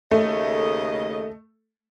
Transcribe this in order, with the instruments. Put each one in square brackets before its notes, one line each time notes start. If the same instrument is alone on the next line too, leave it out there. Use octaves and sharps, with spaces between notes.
[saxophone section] D#2 C#3 D#5 [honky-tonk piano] A3